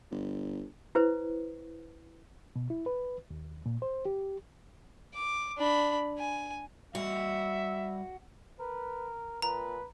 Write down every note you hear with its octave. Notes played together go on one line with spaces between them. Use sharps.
G1
E4 B4 C5
B2
E4
B4
D#2
A#2
C5
G4
D6
D4 B5
G#5
G3 F#4 D#5 E5
A#4 B4
A#2 B4 A#5